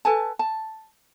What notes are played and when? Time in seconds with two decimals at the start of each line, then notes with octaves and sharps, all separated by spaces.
0.05 A4 B4 G#5 A5
0.39 A5